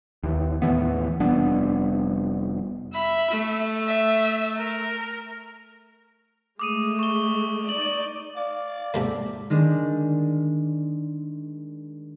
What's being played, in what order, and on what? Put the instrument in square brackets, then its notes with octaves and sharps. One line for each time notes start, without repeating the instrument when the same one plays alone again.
[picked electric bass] D#2 E3
D#2 A2 E3 B3
F1 G3 B3 D4
[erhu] E5 [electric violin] B5
[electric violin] A3
[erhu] E5
A#4
[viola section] G#3 A3 [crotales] D6 D#6 D#7
[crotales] C#6 G7
[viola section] D#4 D5 [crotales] F#7
[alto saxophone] D5 [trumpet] F5
[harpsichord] G#2 C3 A#3 [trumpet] A4
[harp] D#3 G#3 D4